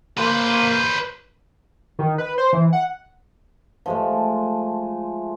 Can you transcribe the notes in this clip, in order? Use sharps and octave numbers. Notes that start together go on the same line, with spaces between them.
A#3 B4 C5
D#3
B4
C5
E3
F#5
F3 G#3 A3